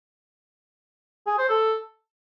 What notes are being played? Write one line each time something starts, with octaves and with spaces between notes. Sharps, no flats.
G#4
C5
A4